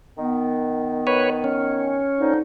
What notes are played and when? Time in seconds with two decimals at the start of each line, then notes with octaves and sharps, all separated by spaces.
0.17 D#3 B3
1.07 B4 C#5
1.44 C#4
2.19 D3 F3 D#4